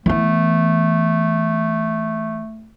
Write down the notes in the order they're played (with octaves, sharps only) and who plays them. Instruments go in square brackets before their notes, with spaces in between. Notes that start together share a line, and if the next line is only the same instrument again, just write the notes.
[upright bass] E3 B3 [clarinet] A3